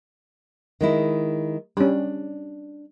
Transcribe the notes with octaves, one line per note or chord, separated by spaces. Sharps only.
D#3 G#3 E4
G3 C#4 D4